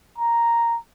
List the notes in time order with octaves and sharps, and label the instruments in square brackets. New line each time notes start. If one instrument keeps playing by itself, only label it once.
[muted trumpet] A#5